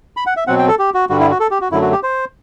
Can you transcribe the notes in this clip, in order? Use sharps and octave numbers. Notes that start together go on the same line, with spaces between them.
B5
F#5
E5
B2 F#3 C4 F#5
G5
A4
G4
F#4
G2 D3 G3 F#4
E4
F#4
A4
G4
F#4
F#2 D3 F#3 A3 E4
F#4
G4
C5